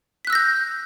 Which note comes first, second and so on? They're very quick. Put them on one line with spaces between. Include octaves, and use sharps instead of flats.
B6 F#6 E6 A#6 G6